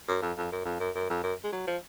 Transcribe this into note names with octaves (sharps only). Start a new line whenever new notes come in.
F#2
F2
F2
F#2
F2
F#2
F#2
F2
F#2
G#3
F#3
F3